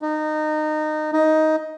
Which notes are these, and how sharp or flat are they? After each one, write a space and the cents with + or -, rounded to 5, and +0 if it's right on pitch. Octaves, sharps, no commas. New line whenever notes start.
D#4 -20
D#4 +10